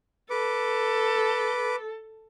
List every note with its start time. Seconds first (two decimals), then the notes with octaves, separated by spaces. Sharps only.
0.30 A4 B4 D6